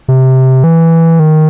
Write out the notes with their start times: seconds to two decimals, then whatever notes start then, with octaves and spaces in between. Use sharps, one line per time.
0.08 C3
0.64 E3
1.19 D#3